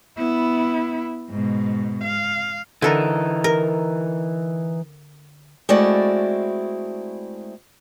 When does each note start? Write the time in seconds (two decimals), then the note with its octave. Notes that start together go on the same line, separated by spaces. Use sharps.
0.18 B3 E4
1.30 G#2 B2
2.04 F5
2.82 D3 E3 D#4 A4 A#4
3.44 A#4
5.69 G#3 A3 C4 E4 F#4 D5